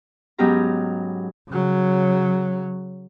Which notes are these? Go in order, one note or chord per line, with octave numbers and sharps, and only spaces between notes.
G#2 F#3 B3 C#4 G4 A#5
C#3 F#3